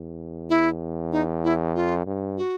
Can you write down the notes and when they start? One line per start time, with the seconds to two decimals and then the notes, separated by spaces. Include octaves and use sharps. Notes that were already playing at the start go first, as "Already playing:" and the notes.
Already playing: E2
0.50 E4
1.12 D#4
1.44 E4
1.75 F2 F4
2.06 G2
2.37 F#4